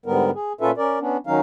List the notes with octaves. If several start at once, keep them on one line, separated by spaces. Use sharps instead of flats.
G#2 D3 G3 B3 A#4
G#4
A#2 C#4 F4 A4 B4 E5
C#4 A#4 D5
B3 C#4 D4
D#3 F#3 C#4 D#4 F5